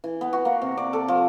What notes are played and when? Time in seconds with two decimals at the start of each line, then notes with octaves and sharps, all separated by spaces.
0.04 E3
0.21 B3
0.33 F#4
0.45 A#3
0.62 C3
0.77 D5
0.93 A4
1.08 F3